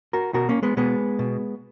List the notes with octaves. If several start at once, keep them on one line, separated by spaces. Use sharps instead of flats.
F#4 A#4
B2 F#4 A#4
A#3 C#4
G#3 B3
B2 G#3 B3
B2